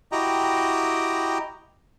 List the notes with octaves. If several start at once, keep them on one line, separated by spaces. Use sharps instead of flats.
E4 F#4 G4 D#5 G5 A#5